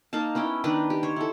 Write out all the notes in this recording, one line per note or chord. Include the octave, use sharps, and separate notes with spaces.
A#3 D#4 F5 A5
B3 C#4 E4 G5
D#3 B3 D4 B4
G4
C5 C#5
E4 A4